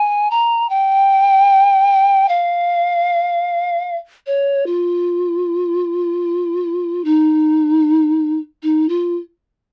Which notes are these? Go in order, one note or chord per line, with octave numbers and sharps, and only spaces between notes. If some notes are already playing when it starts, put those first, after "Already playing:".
Already playing: G#5
A#5
G5
F5
C#5
F4
D#4
D#4
F4